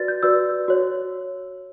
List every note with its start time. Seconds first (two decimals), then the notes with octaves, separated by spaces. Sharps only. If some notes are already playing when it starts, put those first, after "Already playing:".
Already playing: F#4 B4 D5 A6
0.08 G6
0.23 F#4 B4 D5 E6
0.68 F#4 C#5